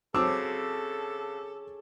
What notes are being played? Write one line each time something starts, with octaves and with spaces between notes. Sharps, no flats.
C#3 F#3 C4 A4 A5 D6 E6